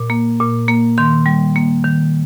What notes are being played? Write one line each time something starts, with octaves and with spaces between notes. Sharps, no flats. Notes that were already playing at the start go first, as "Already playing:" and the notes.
Already playing: A#2
A#3
A#2
A#3
D#3 C6
G3
A#3
D#3